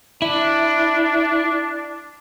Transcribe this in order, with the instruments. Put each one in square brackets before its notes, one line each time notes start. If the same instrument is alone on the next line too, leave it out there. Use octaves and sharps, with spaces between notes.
[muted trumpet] D4 [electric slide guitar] E4